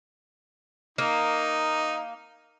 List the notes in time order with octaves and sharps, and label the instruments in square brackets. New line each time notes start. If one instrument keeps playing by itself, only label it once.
[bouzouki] A#3 [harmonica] D#4